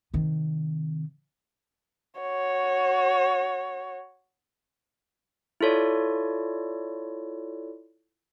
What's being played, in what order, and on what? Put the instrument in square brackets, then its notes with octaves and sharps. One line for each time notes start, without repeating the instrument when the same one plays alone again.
[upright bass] C3 D#3
[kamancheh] F#4 C#5
[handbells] E4 F4 A4 C#5 D5